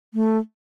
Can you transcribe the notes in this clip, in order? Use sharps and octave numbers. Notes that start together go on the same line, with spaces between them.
A3